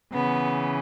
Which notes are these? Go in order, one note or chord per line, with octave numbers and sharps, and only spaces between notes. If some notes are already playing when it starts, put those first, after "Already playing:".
C#3 E3 B3